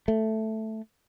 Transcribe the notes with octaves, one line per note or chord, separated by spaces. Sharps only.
A3